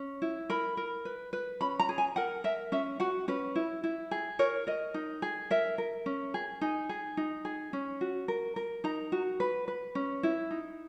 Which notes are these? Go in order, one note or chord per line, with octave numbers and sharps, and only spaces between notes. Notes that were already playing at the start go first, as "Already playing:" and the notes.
Already playing: C#4
E4
A#4 B5
A#4
B4
B4
C#4 B5
A#5
G#4
G#5
A#4 F#5
A#4 E5
C#4 E5
F#4 F#5
C#4 B4
E4
E4
G#4
A#4 C#5
A#4 D#5
D#4
G#4
A#4 E5
A#4
C#4
G#4
D#4 G#5
G#4
D#4
G#4
C#4
F#4
A#4
A#4
D#4 A#5
F#4
B4
B4
C#4
E4
D#4